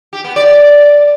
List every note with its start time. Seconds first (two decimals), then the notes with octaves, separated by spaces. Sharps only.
0.13 G4
0.24 B3
0.36 D5